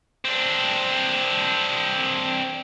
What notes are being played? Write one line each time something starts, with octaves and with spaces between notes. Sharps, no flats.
C4 D4